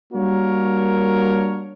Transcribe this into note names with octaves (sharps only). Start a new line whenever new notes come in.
G3 A#3 D4 F#4 A#4 C#5